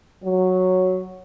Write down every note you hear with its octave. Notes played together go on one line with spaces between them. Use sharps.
F#3